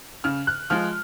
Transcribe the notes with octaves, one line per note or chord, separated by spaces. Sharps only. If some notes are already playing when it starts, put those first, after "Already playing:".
C#3 F6
F#6
F3 G#3 F6